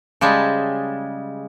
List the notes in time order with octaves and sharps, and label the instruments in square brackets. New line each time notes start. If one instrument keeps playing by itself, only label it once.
[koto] C#3 G3 G#3 A5